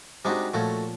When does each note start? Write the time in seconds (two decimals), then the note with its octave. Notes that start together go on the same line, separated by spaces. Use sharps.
0.25 C3 G#3 D4 D#4 F#4 G4
0.54 A#2 F3 A3 F#4 C#5